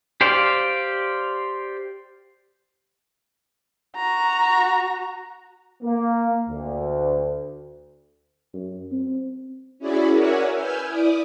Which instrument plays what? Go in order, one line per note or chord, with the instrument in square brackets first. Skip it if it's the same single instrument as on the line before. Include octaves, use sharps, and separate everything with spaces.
[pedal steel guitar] G4 C5 D5 F5 G5
[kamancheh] F#4 A#5
[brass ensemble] A#3
D2
[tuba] F#2
C4
[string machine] C#4 E4 F#4 G#4 D5 B5
A#4 C#5 D5 E5 F#5 G#5
B4 G#5 E6 F6 G6
E4 D5 D6 D#6